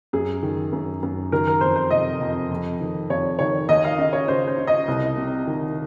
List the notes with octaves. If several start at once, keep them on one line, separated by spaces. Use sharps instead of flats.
F#2 G#4
D#3
F#2
F#2
D#3 A#4
A#4
F2 C5
C5
C3 D#5
F2
F2
D#3
F2 C#5
D#3 C#5
D#2 D#5
F5
C#3 D#5
C#5
C#3 C5
C5
C#3
D#5
C2
C3
D#3